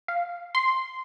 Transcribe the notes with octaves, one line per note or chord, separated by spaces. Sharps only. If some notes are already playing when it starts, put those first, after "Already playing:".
F5
C6